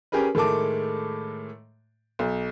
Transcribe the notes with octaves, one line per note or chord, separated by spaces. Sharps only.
C#4 G4 G#4 A#4 B4
A2 D#3 G#3 A3 A5 D6
B1